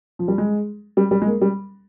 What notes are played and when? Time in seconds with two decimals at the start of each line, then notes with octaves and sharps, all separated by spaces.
0.19 F3
0.28 G3
0.38 G#3
0.97 G3
1.11 G3
1.22 G#3
1.26 A#3
1.41 G3